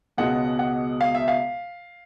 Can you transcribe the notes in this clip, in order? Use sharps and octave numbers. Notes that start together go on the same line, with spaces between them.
C#2 B2 G#3 F#5
F#5
F5
E5
F5